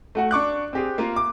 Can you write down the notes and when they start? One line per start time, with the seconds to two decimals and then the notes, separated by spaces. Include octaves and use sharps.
0.15 A3 F#4 F#5
0.31 D4 C#6 D6 F#6
0.73 C4 G4 G#4
0.98 A#3 F4
1.16 D6